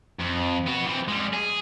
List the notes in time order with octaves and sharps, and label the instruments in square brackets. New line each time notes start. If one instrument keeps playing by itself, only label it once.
[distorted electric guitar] F2
B3 F#4
E3 C4
G3 G#3
G#4